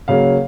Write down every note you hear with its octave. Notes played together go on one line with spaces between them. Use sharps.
C#3 F#3 A#3 F5